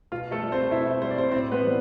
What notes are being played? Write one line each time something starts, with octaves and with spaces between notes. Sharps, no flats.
B2 F4
A3 A4
G3
C4 C5
B2 E4 E5
G3 C5
D5
C4 C5
A2 C4 C5
B3 B4
E3 G3